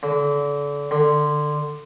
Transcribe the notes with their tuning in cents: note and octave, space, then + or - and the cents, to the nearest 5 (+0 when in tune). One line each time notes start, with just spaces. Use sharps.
D3 -30
D3 +20